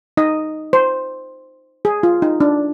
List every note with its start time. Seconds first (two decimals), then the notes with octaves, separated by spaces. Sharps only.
0.17 D#4 D#5
0.73 C5
1.85 G#4
2.03 F4
2.22 D#4
2.40 D4